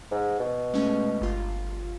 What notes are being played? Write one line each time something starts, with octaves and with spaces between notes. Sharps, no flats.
G#2
B2
G#3 A3 C#4
G1 F4